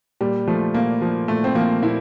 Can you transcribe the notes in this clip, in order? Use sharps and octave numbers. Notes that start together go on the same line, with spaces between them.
A#2 G3
F3 A3
A#2 A#3
F3
A#2 A3
C4
F3 A#3
A#2 E4